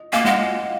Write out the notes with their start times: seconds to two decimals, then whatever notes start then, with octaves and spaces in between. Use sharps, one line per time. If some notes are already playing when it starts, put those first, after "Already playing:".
Already playing: D#5
0.13 A#3 F5 G#5
0.25 G#3 D#5 F#5